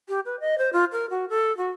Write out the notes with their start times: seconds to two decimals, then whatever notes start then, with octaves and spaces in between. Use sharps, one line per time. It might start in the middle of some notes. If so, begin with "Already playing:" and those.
0.09 G4
0.25 B4
0.40 D#5
0.58 C5
0.73 F4
0.92 A#4
1.10 F#4
1.29 A4
1.57 F#4